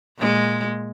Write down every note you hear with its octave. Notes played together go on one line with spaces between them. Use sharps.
A#2 G#3